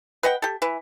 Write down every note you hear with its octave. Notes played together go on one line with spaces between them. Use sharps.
B4 D#5 F#5 G5
G4 A4
E3 B4